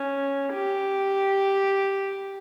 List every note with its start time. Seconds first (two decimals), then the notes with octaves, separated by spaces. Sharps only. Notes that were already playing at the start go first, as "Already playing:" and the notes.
Already playing: C#4
0.52 G4